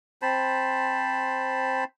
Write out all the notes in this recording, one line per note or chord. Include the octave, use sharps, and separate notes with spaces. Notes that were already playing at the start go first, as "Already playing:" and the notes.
C4 C5 A5 B5